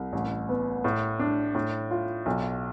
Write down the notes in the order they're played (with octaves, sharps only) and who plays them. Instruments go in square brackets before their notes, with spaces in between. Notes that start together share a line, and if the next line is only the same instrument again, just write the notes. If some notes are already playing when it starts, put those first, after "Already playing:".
Already playing: [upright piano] C2
A1
B3
A2
D4
A2
F4
B1